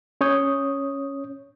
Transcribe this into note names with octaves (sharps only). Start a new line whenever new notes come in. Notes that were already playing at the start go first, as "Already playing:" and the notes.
C#4 C#5 D#6 G6